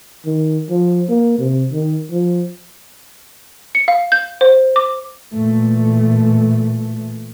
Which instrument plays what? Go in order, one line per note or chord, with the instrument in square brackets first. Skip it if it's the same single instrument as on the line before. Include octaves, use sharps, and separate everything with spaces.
[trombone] D#3
F3
A#3
C3
D#3
F3
[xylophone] C#7
F5
G6
C5
D6
[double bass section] A#2 E3 A3